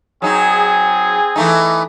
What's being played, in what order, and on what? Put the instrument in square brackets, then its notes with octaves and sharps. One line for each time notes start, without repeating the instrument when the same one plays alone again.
[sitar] F#3 D#4 [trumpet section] C4 G#4
[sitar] E3 A3 D#4